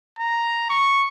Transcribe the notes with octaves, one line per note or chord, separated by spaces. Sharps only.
A#5
C#6